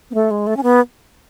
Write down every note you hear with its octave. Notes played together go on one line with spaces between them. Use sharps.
B3
A3
G#3
A3
C#4
B3